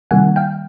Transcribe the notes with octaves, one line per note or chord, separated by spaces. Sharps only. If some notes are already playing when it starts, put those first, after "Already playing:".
C3 D#3 G3 A#3 F#5 G#5
F5 G5